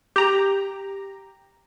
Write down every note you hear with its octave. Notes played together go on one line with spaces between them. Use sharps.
G4 A#5